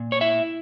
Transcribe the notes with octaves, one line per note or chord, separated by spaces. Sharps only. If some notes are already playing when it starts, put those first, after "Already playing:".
Already playing: A#2
C#5
E4 E5